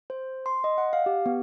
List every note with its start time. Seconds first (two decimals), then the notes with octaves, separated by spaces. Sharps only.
0.10 C5
0.46 C6
0.64 D#5
0.78 F#5
0.93 F5
1.06 G4
1.26 B3